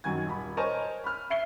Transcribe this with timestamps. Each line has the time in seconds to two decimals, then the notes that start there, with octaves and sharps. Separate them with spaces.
0.04 F#2 D#3 F#3 G#5 G#6
0.26 D#1 B5
0.57 A#4 C5 C#5 D#5 G#5 A5
1.04 B5 F6
1.30 E5 C7 G7